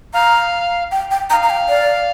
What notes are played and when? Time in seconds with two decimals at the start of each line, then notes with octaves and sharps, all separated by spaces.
0.14 F5 A#5
0.92 G5
1.11 G5
1.30 G5 A#5
1.33 F5
1.43 A#5
1.50 G5
1.69 D5